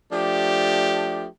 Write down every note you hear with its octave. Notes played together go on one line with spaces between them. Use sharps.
F3 A3 D4 G4